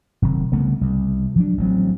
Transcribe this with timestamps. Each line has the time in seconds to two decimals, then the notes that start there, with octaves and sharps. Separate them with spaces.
0.22 F#1 C3 D#3
0.52 C2 C#3 A3 B3
0.81 C2
1.36 F3 F#3 D4
1.58 A1 F#3 C4